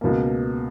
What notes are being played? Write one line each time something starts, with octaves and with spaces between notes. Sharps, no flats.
C#2 B2 A#3